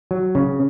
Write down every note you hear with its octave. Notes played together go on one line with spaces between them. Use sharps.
F#3
C#3